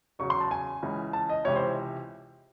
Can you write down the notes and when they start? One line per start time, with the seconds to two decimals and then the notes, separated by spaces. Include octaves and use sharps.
0.19 E2 C#3 F#3 C#6
0.30 C6
0.40 A5
0.51 G#5
0.83 C#2 C#3 E3
1.13 A5
1.29 D#5
1.45 C#2 C3 E3 C#5
1.56 C5